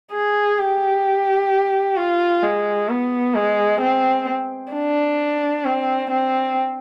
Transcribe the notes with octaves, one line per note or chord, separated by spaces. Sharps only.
G#4
G4
F4
G#3
B3
G#3
C4
D4
C4
C4